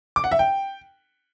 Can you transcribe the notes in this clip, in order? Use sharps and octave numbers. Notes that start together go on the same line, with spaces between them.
D6
F#5
E5
G5